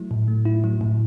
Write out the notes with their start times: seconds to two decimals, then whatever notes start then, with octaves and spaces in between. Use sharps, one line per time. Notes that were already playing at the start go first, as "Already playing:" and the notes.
Already playing: F#3 A3 E4
0.11 A2
0.28 A3
0.45 E4
0.64 F#3
0.81 A2